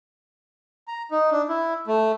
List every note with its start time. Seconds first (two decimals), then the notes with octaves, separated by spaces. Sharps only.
0.88 A#5
1.11 D#4
1.31 D4
1.49 E4
1.87 A3